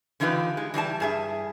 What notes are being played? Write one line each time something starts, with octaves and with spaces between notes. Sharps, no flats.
D3 E3 D#4 F4 G4 B4
G#3
E3 G3 D#4 A5
G2 G#4 E5